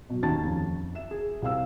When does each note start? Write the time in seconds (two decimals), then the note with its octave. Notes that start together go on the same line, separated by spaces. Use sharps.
0.10 B2 F#3
0.23 D#2 D#3 C#4 D#4 A5 A6
0.45 F2
0.95 E5 E7
1.11 G#4
1.42 C2 C4 F5 E6